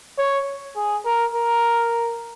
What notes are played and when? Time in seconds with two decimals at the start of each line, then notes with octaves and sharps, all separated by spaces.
0.18 C#5
0.76 G#4
1.05 A#4
1.34 A#4